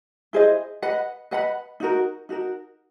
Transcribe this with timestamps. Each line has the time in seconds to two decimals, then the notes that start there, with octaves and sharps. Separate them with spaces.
0.33 E4 G#4 C5 D#5
0.82 B4 D#5 F#5 B5
1.31 B4 D#5 F#5 B5
1.80 D#4 F#4 A#4
2.29 D#4 F#4 A#4